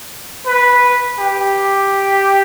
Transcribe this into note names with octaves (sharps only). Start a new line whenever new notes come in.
B4
G4